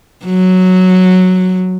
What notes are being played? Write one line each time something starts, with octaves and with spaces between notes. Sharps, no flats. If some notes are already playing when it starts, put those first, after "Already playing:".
F#3